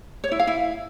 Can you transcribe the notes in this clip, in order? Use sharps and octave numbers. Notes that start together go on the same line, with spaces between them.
C#5
E4
F5
E4